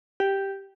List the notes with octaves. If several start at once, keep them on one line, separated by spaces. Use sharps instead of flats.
G4